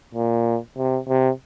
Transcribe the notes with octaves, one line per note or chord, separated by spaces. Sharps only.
A#2
C3
C3